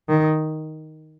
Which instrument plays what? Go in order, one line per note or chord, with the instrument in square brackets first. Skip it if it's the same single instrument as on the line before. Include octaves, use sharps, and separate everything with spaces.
[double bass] D#3